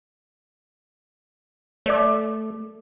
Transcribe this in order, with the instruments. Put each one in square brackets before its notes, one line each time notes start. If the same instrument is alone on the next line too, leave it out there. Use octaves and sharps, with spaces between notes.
[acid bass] A3 [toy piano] C#5 D5 D6